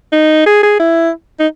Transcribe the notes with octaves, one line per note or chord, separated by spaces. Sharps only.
D#4
G#4
G#4
E4
D#4